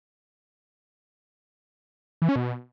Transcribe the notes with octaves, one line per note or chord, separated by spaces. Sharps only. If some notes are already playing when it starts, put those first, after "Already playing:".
E3
C#4
B2